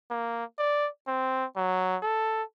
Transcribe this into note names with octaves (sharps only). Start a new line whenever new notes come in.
A#3
D5
C4
F#3
A4